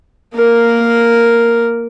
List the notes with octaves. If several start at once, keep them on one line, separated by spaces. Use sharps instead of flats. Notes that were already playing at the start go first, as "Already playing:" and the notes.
A#3 A#4